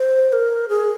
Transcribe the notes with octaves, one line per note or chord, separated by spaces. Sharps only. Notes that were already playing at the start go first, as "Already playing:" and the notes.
Already playing: C5
C5
A#4
G#4